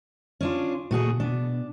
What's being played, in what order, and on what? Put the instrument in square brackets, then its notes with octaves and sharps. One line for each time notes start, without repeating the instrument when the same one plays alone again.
[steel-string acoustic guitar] C#4 D4 F4
[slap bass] A#2 C#3 [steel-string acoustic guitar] A3 F#4 G#4
[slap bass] B2 B3 [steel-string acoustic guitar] D4